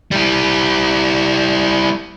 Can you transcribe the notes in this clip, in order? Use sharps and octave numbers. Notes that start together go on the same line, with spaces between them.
G3 E4